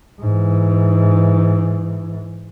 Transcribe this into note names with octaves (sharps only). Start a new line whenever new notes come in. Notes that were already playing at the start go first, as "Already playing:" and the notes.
G#2 E3